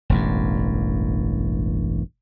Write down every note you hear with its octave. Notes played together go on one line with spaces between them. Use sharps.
E1 A1 G2